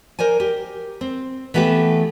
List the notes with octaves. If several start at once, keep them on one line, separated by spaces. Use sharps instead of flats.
A#4 C5 D5 G#5
G4
C4
E3 A3 B3 G4 B4